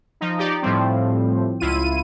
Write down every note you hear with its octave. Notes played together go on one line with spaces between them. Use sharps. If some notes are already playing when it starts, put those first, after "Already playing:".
F3 D#4
D#4 G4 D5
A2 F3 G3 C4
C#2 E4 F4 D#7